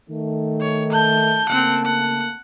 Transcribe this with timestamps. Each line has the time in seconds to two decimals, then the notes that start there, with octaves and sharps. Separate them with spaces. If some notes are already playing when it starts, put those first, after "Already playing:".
0.10 D#3 A3
0.61 C#5
0.92 A5 G6
1.49 C#3 A3 A#3 C4 F#5
1.85 F#5